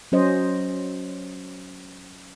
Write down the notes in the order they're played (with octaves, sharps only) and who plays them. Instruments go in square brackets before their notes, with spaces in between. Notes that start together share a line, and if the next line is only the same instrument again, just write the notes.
[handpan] F#3 C#4 C5 D#5